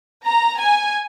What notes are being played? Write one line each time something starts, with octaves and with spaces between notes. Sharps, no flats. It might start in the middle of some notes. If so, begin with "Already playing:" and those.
A#5
G#5